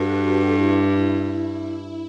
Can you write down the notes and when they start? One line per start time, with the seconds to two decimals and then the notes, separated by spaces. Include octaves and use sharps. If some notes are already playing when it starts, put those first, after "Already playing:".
Already playing: G2 F#4 A4 B4
0.18 G4
0.53 E4